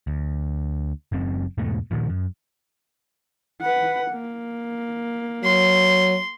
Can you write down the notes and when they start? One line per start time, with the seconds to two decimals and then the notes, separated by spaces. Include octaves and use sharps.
0.07 D2
1.12 F#1 F#2 C4
1.58 E2 G#2 B2 A3
1.91 A#2 D#3 F3
2.09 F#2
3.62 B4 F#5
4.12 A#3
5.44 F#3 C6